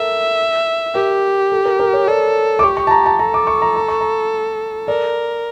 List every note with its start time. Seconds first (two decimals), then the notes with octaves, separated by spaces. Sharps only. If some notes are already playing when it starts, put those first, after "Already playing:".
Already playing: A4 A#4 E5
0.95 G4 A#4
1.52 A4
1.65 A#4
1.80 A#4
1.93 C#5
2.08 A4 D5
2.59 D6
2.63 G4 C#6
2.77 C#6
2.87 A5
2.91 A#5
3.06 A5
3.19 A4 A#5
3.34 D6
3.47 C#6
3.62 A#5
3.76 A#5
3.88 C#6
4.01 A#5
4.88 A#4 D5